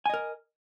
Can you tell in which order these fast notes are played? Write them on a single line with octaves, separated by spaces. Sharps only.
G#5 D#5 A#4